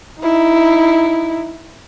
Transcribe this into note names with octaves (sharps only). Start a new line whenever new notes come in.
D#4 E4